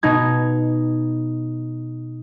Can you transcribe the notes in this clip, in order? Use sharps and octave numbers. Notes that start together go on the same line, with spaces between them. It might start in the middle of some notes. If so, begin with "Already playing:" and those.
B2 B3 D#4 G#6